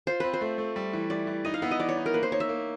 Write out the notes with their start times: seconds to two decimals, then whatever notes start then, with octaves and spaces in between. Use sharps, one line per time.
0.07 F4 C5
0.20 C4 B4
0.34 C5
0.41 A3
0.58 A3
0.76 G3
0.94 E3
1.10 E3 D5
1.27 E3
1.45 D#4 D#5
1.54 F5
1.62 B3 E5
1.71 D#5
1.80 E3 D5
1.89 C#5
1.97 D#4
2.06 A#4
2.14 A#3 B4
2.23 C5
2.32 D#4 C#5
2.40 E5
2.49 A#3